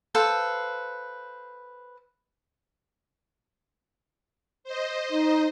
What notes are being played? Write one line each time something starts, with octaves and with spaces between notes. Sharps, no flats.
A4 B4 C5 F5
C5 D#5
D#4